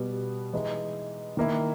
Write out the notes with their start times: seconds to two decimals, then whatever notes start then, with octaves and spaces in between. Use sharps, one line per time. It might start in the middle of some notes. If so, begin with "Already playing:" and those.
Already playing: B2 G3 B3
0.53 E3 G#3 D#4
1.37 D#3 A#3 E4